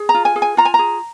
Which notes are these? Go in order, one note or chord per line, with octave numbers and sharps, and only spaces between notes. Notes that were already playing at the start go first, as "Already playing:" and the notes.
Already playing: G#4
A#5
F4
G#5
G#4
G#5
F4 A#5
G#5
G#4 A#5